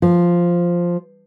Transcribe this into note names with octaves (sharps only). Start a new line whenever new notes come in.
F3